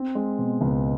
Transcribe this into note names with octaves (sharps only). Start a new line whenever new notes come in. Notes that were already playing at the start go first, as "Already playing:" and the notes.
Already playing: C4
G#3
B2
C#2